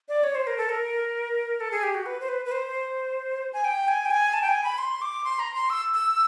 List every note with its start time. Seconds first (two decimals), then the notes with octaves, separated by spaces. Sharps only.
0.09 D5
0.24 C#5
0.35 C5
0.47 A#4
0.58 A4
0.69 A#4
1.60 A4
1.71 G#4
1.83 G4
1.94 F#4
2.06 B4
2.20 C5
2.29 B4
2.45 B4
2.52 C5
3.53 G#5
3.64 G5
3.88 G#5
4.05 G5
4.11 G#5
4.33 A5
4.42 G5
4.49 G#5
4.64 B5
4.78 C6
5.02 D6
5.24 C6
5.39 A#5
5.54 C6
5.70 E6
5.94 E6